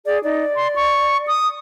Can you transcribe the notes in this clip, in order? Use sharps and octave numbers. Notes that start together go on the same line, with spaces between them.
G#4 D5
D#4 D5
C6
C#6
D#6